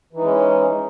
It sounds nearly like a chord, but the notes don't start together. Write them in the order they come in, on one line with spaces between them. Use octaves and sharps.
E3 D#4 G#3 C#4